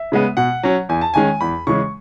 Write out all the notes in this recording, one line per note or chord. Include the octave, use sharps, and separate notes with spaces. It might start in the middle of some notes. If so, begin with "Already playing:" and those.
Already playing: E5
C#3 G#3 B3
B2 F#5
F#3 C#4
E2 G#5
A5
D#3 G#3 C#4 G#5
E2 B5
C#3 E3 G#3 C#4 C#6